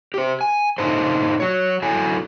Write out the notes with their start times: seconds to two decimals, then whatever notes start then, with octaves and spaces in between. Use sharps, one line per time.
0.14 G4 C5
0.41 G#5
0.78 A#2 D#4 F4 A4 C5
1.40 F#3 C#5
1.82 F#3 E4 A4 G#5